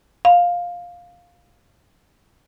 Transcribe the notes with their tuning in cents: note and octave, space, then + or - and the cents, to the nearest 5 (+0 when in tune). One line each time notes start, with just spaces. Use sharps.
F5 +10